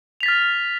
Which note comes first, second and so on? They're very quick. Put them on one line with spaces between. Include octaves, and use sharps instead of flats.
F7 B6 A6 F6